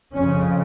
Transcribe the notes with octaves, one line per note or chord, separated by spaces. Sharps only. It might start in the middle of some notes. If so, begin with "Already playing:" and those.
F2 C#3 C#4